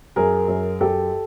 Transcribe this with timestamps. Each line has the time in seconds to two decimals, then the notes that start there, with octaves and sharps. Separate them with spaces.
0.16 F#2 G#4 A#4
0.48 F#2
0.80 F#2 G4 A4